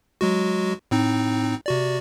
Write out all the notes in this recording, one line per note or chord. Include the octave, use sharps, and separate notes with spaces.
F#3 G#3 F#4
A2 C4 D#4
C3 F#4 D5